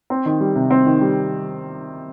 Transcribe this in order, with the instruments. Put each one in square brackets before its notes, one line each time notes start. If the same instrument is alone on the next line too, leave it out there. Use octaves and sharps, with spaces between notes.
[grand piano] C4
D#3
G3
C3
C4
D#3
G3